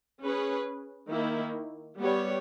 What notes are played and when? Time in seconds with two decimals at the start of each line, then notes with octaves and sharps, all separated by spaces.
0.22 C#4 G#4 B4
1.10 D#3 A#3 E4
1.99 G3 B3 G4 C#5